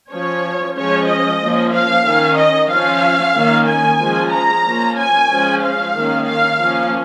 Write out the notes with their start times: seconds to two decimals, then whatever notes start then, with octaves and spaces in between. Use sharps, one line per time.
0.11 F3 C#4 C#5
0.76 F3 G#3 C#4 C#5
1.08 D#5
1.41 F3 A#3 C#4
1.73 F5
2.06 D#3 C#4
2.38 D#5
2.70 F3 C#4 F5
3.35 D#3 A#3 C#4
3.67 G#5
3.99 F3 G#3 C#4
4.32 A#5
4.64 F3 A#3 C#4
4.97 G#5
5.29 F3 G#3 C#4
5.62 F5
5.94 D#3 A#3 C#4
6.26 F5
6.59 F3 A#3 C#4